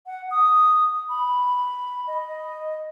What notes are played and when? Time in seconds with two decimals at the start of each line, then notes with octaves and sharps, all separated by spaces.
0.06 F#5
0.31 D#6
1.09 B5
2.07 D#5